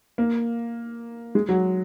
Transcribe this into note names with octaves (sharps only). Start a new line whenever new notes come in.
A#3
G#3
F#3